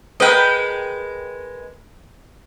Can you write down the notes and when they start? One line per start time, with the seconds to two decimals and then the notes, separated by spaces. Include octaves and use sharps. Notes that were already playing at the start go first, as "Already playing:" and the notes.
0.20 G#3 A#4 B4 D#5 G5